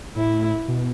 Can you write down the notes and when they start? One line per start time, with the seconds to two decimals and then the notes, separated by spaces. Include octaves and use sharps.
0.16 A2 E4
0.68 B2